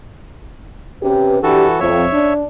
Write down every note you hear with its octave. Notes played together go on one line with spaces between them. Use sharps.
C3 C#4 G4 B4
E3 D4 F#4 G4 A4
F2 C#5 E5
D4